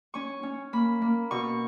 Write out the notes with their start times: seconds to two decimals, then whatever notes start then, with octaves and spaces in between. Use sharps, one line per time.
0.14 C#4 C#6
0.43 C#4
0.73 A#3 B5
1.02 A#3
1.31 B2 C#6